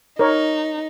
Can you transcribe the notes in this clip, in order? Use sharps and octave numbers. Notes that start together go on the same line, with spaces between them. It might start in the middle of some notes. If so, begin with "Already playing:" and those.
D#4 A#4 C#5